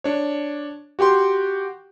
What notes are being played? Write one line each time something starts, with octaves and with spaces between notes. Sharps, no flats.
D4 C#5
F#4 G4 G5 C6